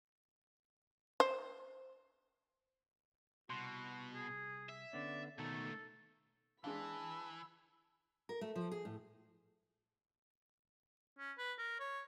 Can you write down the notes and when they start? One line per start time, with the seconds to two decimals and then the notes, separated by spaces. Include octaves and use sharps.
1.20 C5
3.50 C2 B2 F#4 C6
4.14 G#4
4.69 E5
4.93 D3 B3 C#4 D5
5.38 C#2 B2 D#3 A3 A4
6.64 E3 G#3 D4 F5 A5 B5 E6
8.29 A#4
8.41 A3
8.56 F3
8.71 G#4
8.85 A2
11.18 C#4
11.39 B4
11.58 A#4
11.80 C#5